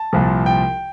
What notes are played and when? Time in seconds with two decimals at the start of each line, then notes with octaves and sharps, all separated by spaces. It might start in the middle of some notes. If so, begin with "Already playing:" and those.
Already playing: A5
0.13 C2 A#2 F3
0.46 G5